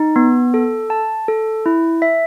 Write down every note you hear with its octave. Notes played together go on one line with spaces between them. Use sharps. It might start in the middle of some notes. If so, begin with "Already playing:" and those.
Already playing: D#4
B3
A4
A5
A4
E4
E5